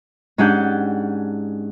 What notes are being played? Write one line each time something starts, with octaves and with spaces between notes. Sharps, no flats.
G#2 C#4 D4 G4 F#5 G6